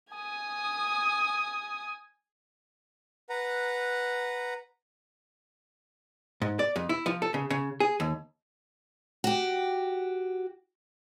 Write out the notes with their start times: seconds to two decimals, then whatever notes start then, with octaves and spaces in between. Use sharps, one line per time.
0.14 G#5 D#6
3.29 B4 F#5 A#5
6.42 G#2
6.59 D5
6.76 F2
6.89 E4
7.06 F3
7.22 A4
7.34 C#3
7.50 C#3
7.80 G#4
8.00 D#2
9.24 F#4 G4